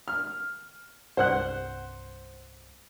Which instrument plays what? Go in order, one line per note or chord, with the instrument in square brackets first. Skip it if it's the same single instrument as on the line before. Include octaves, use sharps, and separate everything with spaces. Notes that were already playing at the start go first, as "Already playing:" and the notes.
[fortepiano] F6
[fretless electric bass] C2 G2 [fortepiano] C5 F#5 F#6